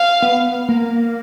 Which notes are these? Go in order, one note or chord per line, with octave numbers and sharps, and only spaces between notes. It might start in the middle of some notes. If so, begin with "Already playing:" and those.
Already playing: F5
B3
A#3